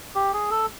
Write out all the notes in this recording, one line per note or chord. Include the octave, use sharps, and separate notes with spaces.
G4
G#4
A4